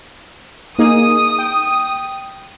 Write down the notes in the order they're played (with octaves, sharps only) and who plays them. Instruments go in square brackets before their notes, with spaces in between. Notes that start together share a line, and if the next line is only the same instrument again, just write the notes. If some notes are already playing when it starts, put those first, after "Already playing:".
[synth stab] A#3 D#4 G#4 [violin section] D#6
[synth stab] G5